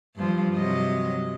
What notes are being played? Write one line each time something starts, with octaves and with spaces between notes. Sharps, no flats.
G2 F3
C3 F#3 D#5